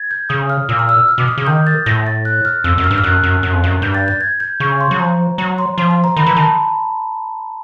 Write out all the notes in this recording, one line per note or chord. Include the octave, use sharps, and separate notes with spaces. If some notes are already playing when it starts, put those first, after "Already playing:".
Already playing: G#6 A6
G6
C#3 D#6
F6
A#2 E6
F6
E6
F6
B2 D6
D#6
C#3
D#3 G6
A6
A2 A#6
A6
F#6
F6
F2 E6
F#2
F6
G2
F6
F#2 F#6
F#2
F#2
F2
F#2
G2 G6
A6
A6
G#6
G6
C#3 C#6
C6
F#3
F3 A#5
F#3 A#5
C6
F3 C6
C6
A#5
D#3 B5
E3 A#5
D#3 A5